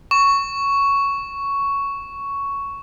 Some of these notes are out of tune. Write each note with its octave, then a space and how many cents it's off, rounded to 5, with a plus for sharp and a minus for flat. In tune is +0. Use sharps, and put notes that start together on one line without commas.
C#6 +5